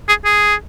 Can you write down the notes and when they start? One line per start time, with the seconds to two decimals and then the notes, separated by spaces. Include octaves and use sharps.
0.08 G#4
0.25 G#4